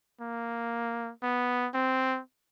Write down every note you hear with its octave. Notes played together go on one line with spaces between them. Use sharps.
A#3
B3
C4